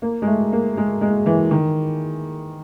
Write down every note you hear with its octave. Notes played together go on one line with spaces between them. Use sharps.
A#3
G#3
A3
A#3
G#3
G#3
E3
D#3